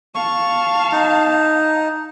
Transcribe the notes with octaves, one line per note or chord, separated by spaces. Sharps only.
F5 A5 C#6
D#4